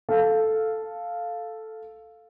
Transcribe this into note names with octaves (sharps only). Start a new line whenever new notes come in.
A4 F5